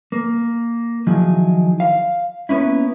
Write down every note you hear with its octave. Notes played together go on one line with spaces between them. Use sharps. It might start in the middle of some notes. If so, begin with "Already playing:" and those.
A#3
D#3 F3 F#3 D#4 E4 G#4
F5
A#3 B3 C#4 E4